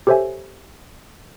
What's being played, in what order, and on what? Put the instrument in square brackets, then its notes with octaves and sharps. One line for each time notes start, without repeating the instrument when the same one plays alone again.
[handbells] G4 A4 C5 C#5 E5 G#5